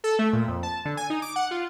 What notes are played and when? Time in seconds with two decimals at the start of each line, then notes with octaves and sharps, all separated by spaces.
0.04 A4
0.19 A3
0.33 A#2
0.48 F2
0.63 A5
0.85 D3
0.97 G#5
1.10 D#4
1.22 D6
1.36 F#5
1.51 F4